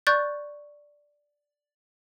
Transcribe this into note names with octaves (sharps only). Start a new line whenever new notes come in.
D5 C#6 F#6 G6 A6